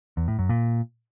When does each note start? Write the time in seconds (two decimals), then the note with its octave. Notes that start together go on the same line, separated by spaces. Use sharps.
0.17 E2
0.28 A2
0.39 F#2
0.49 A#2